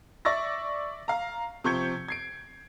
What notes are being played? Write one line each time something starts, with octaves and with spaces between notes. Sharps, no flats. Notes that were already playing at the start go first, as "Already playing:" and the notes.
D5 E5 C#6 E6 A6 A#6
F5 A#5
C3 F3 C#6 G6 G#6 C#7
G#6 C7 D7